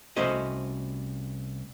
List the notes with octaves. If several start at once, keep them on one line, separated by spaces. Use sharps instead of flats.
C2 A3 C#4 F#4 C5 D#5